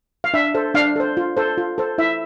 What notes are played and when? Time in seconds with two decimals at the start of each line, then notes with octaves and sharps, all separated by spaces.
0.24 F5
0.34 D4 E5
0.55 A4 C5
0.74 D4 F5
0.96 A4 C5
1.17 F4
1.37 A4 C5
1.58 F4
1.78 A4 C5
1.98 E4 E5